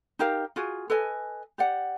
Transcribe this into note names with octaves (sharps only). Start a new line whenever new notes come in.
D#4 G4 A#4 F5
F4 F#4 G#4
A4 B4 D#5 G#5
G4 D5 F#5